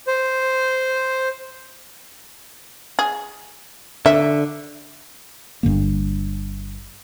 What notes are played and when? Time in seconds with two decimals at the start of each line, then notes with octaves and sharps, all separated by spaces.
0.07 C5
2.99 G#4
4.06 D3 E5
5.63 G1 G2 D3 A#3